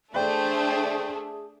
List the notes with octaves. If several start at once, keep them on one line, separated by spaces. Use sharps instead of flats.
A3 D4 G#4 C5 D5 G5